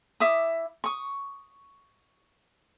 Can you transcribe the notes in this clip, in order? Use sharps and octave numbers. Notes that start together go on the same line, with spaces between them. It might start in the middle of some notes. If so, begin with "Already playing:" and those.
E4 E5 D6 D#6
C#6 D#6